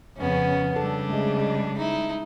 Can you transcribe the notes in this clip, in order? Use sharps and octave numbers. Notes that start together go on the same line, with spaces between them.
F2 C#3 B3 C#4
C#3 G3 D4 A4
G#3 A3
D#4 E4